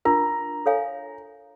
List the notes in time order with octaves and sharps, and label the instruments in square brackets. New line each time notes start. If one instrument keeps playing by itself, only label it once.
[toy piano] D4 F4 A#4 [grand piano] A#5
[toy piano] A4 C#5 F5 G#5